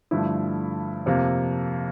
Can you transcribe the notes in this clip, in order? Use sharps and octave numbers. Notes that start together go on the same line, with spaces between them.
G2 D3 F3 A3 E4
F2 C3 F3 A#3